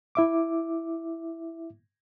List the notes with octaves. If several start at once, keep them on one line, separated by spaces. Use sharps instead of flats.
E4 E5 D6